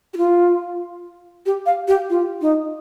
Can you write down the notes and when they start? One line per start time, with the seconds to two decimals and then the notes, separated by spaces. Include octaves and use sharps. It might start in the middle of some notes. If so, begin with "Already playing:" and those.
0.14 G4
0.17 F4
1.46 G4
1.66 F5
1.88 G4
2.10 F4
2.41 D#4